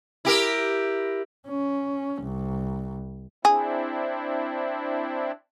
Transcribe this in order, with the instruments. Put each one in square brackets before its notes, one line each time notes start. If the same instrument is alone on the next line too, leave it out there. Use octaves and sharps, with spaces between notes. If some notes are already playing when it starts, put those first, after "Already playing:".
[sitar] E4 G4 A#4
[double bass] C#4
C2
[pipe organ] C4 D4 E4 [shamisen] G#4